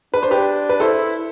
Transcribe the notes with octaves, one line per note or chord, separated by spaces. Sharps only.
D4 B4
C5
G4 B4
B4
E4 A4 C5